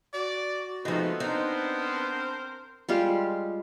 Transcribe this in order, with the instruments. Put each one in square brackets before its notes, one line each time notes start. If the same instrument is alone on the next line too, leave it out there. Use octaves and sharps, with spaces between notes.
[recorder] F#4 [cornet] D5
[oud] F3 D#4 [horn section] G#3 A3 C4 [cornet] B3
[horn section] C4 A#4 C5 [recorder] D4 [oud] D#4
[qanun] G3 G#3 F4 G4